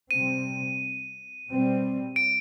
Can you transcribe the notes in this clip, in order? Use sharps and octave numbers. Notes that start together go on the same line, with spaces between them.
C3 G3 C4 D#7
B2 G3 C4
D7